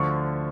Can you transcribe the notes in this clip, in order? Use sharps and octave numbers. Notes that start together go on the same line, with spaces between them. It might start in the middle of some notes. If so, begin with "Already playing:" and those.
Already playing: D2 D3 F3 C#6